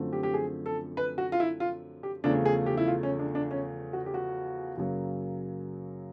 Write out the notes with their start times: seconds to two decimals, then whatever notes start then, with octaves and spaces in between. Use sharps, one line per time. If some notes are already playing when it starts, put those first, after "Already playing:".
Already playing: F#2 D3 F3 A3 C4
0.13 G4
0.23 G4
0.34 G#4
0.66 A4
0.97 B4
1.18 F#4
1.32 F4
1.40 E4
1.60 F4
2.03 G4
2.24 E2 C#3 F3 A3 D4
2.45 G#4
2.66 G4
2.77 E4
2.87 F4
3.03 C#4
3.19 D4
3.35 D4
3.51 C#4
3.93 F#4
4.06 G4
4.14 F#4
4.77 F#2 C#3 F#3 A#3